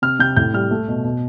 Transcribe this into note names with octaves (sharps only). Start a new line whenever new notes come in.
C3 F6
C3 G6
A2 G6
G3 F6
A3
B2
B2